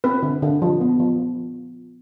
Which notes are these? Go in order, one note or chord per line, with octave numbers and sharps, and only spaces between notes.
C4 B4
D3
D3
F3
B3
F3